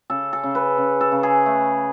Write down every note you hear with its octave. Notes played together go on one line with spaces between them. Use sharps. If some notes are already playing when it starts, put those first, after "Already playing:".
C#3 A4
A4
C#3
B4
C#3
A4
C#3
G#4
A3